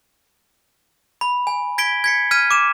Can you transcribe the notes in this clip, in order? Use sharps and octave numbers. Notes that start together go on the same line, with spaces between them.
B5
G#5
G#6 B6 D7 G7
G#6 B6 C#7
F6 G#6 B6 D#7
D6 E7